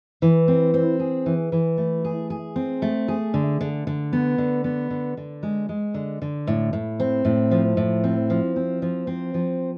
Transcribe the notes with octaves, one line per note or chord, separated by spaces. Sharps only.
E3
C4
C4
G#4
E3
E3
A3
G#4
G#4
C4
A3
G#4
D3
D3
D3
B3
D3
B3
D3
D3
G#3
G#3
D3
D3
A2
A2
C4
A2
F3
A2
C4
F3
C4
F3
C4
F3